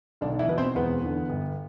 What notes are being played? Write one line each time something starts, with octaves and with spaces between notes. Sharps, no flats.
B1 D3 D4
E3 E4
B2 B4
C4 C5
E1 B3 B4
E2 D3
G1